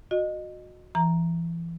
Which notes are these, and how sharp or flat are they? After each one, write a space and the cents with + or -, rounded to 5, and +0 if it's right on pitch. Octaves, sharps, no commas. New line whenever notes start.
F#4 -20 D#5 -20
E3 +30 A#5 +0